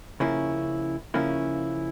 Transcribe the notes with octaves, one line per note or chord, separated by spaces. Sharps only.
C#3 F3 A#3 C#4 E4
C#3 F3 A#3 C#4 E4